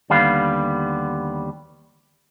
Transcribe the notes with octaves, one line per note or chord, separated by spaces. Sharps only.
D#2 D3 G3 B3 F5